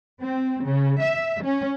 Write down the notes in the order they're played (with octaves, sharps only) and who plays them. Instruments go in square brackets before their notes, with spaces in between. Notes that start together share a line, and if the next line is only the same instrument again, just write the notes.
[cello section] C4
C#3
E5
C#4